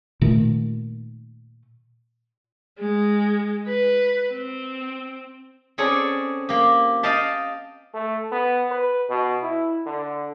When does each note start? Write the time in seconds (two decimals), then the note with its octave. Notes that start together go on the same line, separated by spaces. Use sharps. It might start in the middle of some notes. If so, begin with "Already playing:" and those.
0.21 A#2 D#3 A3
2.79 G#3
3.67 B4
4.33 C4
5.78 C4 C#4 G#4 A4 D5
6.49 A#3 G4
7.03 D#5 F5 G5 A5 B5
7.94 A3
8.32 B3
8.71 B4
9.09 B2
9.43 E4
9.86 D3